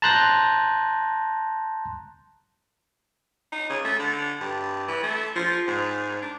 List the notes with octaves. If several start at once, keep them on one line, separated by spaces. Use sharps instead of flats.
A5 A#5 C6 F#6 G6 A#6
D#4
C#3
A3
D3
G2
E3
A3
F3
G#2
D4